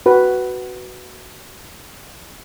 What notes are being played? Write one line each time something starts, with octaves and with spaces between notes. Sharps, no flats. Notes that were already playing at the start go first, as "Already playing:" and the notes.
F#4 B4